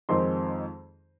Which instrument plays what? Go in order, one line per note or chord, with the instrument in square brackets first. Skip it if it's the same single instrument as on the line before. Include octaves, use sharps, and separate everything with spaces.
[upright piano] F2 D#3 G#3 C4 D#4 C6